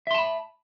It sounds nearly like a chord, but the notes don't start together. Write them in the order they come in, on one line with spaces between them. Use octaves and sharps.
E5 C6 A5 B5